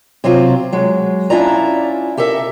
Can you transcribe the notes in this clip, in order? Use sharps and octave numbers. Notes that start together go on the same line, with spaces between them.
C3 F#3 C4 F4
F#3 G#3
C#4 D4 E4 F4 D5 A#5
G4 A4 A#4 E5